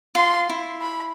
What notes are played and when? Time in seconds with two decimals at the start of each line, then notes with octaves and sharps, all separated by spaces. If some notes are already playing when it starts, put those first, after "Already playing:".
0.15 F4 C6
0.49 E4
0.82 B5